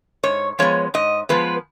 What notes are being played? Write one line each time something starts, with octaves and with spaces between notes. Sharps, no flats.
G#2 C#5
F3 G#3 B3 C#5
G#2 D#5
F3 G#3 B3 B4